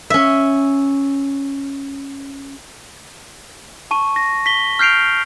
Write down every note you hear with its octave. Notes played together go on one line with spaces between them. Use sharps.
C#4 E5
A5 C#6 D#7
A#6
B6 G7
F6 G6 C7 D7 F7